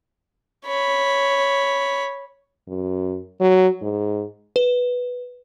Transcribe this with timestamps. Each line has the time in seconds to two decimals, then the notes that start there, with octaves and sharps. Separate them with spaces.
0.66 C#5 B5
2.68 F#2
3.40 F#3
3.82 G#2
4.56 B4